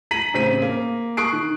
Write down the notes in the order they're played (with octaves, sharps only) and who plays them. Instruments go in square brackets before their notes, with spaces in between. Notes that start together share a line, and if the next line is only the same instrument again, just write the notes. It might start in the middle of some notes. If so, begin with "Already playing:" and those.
[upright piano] A#5 B6 D#7 F#7
A1 C#3 C4 B6 D#7
A#3
C#6 D#6 F#6 C7 D7
D#3